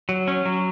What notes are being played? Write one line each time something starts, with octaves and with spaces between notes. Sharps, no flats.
F#3
C#4
F#3